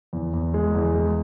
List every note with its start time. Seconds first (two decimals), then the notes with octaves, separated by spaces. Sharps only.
0.13 E2
0.34 E2
0.54 G#3
0.75 E2
0.95 G#3